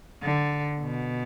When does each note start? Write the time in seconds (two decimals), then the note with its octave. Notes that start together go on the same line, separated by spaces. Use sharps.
0.23 D3
0.81 B2